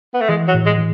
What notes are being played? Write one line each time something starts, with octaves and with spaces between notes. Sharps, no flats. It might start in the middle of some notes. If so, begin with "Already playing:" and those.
B3
A3
E3 G#3
F#3
A2
G#3
E3